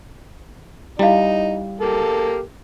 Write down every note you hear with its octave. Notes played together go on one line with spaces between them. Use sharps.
G3 D#4 E4 F5
A#3 G4 A4